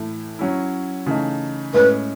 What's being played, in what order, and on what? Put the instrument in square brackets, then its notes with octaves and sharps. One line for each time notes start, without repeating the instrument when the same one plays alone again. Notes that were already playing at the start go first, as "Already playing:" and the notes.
Already playing: [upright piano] A2 E3 A3 E4
F#3 C#4 E4
C#3 E3 A3 D#4
[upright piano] A2 G#3 C#4 E4 [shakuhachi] B4